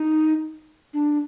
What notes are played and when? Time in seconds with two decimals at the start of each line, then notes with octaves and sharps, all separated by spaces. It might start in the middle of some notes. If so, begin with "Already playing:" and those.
Already playing: D#4
0.93 D4